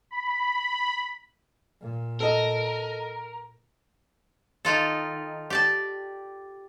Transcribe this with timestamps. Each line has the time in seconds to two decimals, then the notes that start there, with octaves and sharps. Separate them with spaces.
0.11 B5
1.82 A#2
2.20 A4 A#4 D#5
4.65 D#3 D#4 F4 A4
5.50 G4 D5 A5